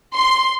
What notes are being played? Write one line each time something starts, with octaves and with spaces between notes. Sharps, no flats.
C6